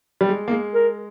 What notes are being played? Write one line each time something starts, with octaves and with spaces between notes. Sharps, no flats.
G3
G#3
A#3
G#3
A#4